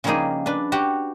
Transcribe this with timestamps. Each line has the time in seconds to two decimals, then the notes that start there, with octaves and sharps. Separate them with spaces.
0.04 C#3 F3 G3 A#3 D#4 G#4
0.46 D4 B4
0.72 F#4 G4 F#5